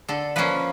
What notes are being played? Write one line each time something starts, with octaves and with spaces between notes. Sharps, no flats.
D3 A4
F3 A#3 C#4 B4